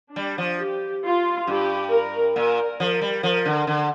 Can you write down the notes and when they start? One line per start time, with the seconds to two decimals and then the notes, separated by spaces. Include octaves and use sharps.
0.16 G3 D4
0.38 F3
0.60 G4
1.05 F4
1.47 G2 G4
1.91 A#4
2.35 A#2 A#4
2.79 F3 A#4
3.01 G3
3.23 F3 A#4
3.46 D3
3.67 D3